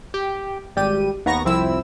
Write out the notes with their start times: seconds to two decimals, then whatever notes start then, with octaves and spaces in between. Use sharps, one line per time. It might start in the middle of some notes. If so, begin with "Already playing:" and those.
0.14 G4
0.76 G#1 G3 G4 D#7
1.26 D#2 B3 A#5 C#6 A#6
1.44 C2 F2 C4 E4 E6